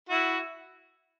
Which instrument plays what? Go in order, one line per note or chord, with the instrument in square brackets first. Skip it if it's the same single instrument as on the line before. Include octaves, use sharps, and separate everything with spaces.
[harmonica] E4 F#4